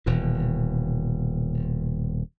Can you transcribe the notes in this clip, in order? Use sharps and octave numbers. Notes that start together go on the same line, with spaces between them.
D#1 B2 E3